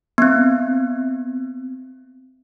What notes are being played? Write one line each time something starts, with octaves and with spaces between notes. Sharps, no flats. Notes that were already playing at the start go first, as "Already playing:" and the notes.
B3 C4